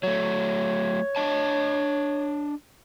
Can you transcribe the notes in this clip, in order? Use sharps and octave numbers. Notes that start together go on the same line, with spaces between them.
F#3 A3 C#5
D4 D#5 A5